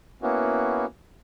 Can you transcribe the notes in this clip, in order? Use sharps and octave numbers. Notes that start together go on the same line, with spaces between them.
A#3 B3 C#4 E4 F#4